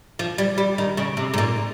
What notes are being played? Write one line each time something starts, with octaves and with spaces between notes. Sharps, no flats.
F3
G3
G3
D#3
C#3
C3
G#2
A#2